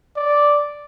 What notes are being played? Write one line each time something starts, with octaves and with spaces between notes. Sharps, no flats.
D5